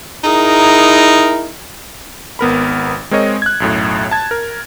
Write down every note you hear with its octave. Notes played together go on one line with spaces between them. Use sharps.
D#4 E4 G#4 A#4
G#1 B3 A#4 B5
G#3 C4 A#4 C#5 D#5
F#6 G#6
B1 F#2 A2
A5 G#6 A6
A#4